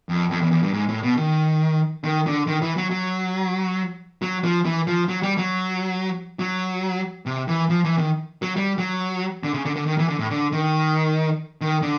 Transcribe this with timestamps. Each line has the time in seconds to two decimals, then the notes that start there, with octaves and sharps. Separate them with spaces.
0.09 F2
0.31 F2
0.42 E2
0.52 E2
0.63 G2
0.74 G#2
0.89 A2
1.03 B2
1.17 D#3
2.04 D#3
2.27 D3
2.47 D#3
2.62 E3
2.77 F#3
2.91 F#3
4.22 F#3
4.44 F3
4.65 E3
4.87 F3
5.08 F#3
5.23 G3
5.38 F#3
6.39 F#3
7.26 C3
7.48 E3
7.69 F3
7.85 E3
7.98 D#3
8.42 F#3
8.56 G3
8.78 F#3
9.44 D3
9.54 C#3
9.65 D3
9.76 D3
9.86 D#3
9.98 E3
10.09 D3
10.19 A2
10.30 D3
10.52 D#3
11.61 D#3
11.82 D3